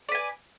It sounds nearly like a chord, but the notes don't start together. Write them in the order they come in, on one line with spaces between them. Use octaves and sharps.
D5 B4 G#5